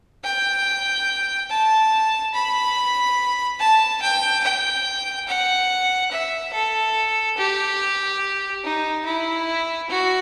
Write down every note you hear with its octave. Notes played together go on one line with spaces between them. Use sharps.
G5
A5
B5
A5
G5
G5
F#5
E5
A4
G4
D#4
E4
F#4